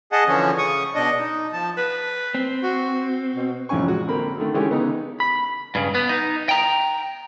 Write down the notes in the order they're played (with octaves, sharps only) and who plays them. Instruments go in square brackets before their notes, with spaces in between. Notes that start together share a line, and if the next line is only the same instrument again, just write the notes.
[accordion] G#4 D#5 F#5 A5
D3 E3 F3 C#4
C#3 C#6 D#6
B2 D4 D#5
D#4
F3 A5
[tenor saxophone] B4
[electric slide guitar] C4
[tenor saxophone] F#4
B2
[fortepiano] A1 F2 C3 C#4 G#5 C#6
G#3 F#4
D3 A#3 C4 A#4 B5
D3 D#3 A3
D3 E3 G#3 C#4 G4 G#4
C#3 B3 D#4
[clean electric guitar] B5
[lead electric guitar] G2 C#3
B3
D#4
G5 A#5